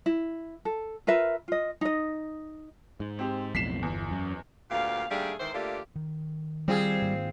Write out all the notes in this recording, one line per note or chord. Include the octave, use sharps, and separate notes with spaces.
E4
A4
F4 A#4 B4 E5
F4 D#5
D#4 D#5
G#2
C4 G4
B1 F2 A2 B6 C7 E7
G1 E2
F#2
D2 A#2 B3 G4 F5
D#2 G3 A3 D4 G#4 F5
G#2 D#3 E3 C5
D3 A3 A#3 F4 G4 D5
D#3
G3 C4 F4 G#4
G#2 D#3 A#3